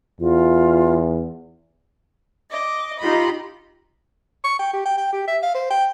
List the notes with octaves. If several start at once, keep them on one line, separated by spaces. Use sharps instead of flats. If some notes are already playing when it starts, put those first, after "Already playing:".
E2 F4
D#5 D6
D#4 F4 G4 D#5 B5
C#6
G5
G4
G5
G5
G4
E5
F5
C5
G5